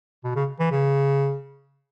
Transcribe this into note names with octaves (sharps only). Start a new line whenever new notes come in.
B2
C#3
E3
C#3